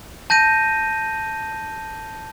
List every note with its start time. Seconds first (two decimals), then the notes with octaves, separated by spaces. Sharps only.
0.30 A5 G6 A#6 D#7